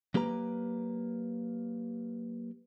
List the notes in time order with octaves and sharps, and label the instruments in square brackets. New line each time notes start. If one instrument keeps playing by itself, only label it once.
[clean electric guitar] F#3 A#3 G4 B4 A#5